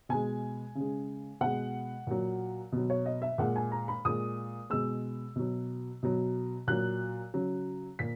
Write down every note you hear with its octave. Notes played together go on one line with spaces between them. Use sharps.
B2 G#3 G#5
C#3
G#3
B2 G#3 F#5
A#2 F#3
B2 F#3
C#5
D#5
E5
A#2 G#3 F#5
G#5
A#5
B5
A#2 G#3 D#6
B2 G#3 E6
B2 F#3
B2 F#3
A#2 F#3 F#6
C#3 F#3
A#2 B6